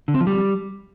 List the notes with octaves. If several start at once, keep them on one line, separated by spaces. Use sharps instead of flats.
D3
C4
F3
G3